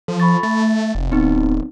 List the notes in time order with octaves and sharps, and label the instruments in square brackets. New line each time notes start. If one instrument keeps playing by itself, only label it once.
[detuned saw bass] F3 [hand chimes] A4
[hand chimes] B5 C#6 A6
[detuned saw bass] A3 [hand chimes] A6
[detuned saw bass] F1
[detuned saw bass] D1 [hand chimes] B3 C4 D#4